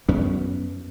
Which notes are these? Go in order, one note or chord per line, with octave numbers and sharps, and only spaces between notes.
F#2 B3 C#4